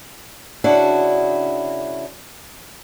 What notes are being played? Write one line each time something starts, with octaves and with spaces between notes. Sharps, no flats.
C#3 D4 E4 F#4